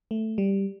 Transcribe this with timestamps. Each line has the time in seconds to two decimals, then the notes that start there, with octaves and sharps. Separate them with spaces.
0.11 A3
0.38 G3